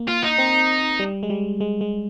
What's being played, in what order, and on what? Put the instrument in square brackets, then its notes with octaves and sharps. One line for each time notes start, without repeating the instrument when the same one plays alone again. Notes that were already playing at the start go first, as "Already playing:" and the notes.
Already playing: [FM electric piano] A#3
[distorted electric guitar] F4
D#4
[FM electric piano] C4
G3
G#3
G3
G#3
G#3